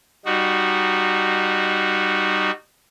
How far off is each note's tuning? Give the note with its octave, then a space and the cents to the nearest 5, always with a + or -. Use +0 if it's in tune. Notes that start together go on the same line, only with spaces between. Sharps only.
G3 +0 D#4 -25 F#4 -5